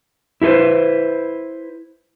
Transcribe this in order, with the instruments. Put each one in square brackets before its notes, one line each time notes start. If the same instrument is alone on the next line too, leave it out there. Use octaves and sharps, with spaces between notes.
[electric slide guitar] E4 G4 A4 B4 C5